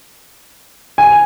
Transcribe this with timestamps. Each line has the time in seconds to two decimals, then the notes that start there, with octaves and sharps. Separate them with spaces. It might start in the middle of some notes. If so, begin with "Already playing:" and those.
0.98 G#5